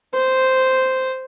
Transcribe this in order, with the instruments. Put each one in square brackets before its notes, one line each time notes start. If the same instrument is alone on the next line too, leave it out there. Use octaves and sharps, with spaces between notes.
[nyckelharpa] C5